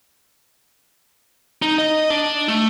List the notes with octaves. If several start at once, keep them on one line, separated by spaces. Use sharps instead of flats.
D#4
D#5
D4
A3